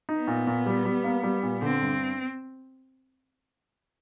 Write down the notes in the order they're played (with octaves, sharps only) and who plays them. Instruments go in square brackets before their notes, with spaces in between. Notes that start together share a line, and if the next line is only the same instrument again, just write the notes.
[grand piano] D#4
[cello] B3
[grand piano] A#2
A#2
G3
G3
A#3
G3
A#2
[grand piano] D3 [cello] C4
[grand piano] G2